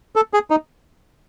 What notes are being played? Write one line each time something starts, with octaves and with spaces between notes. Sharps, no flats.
A4
G#4
D#4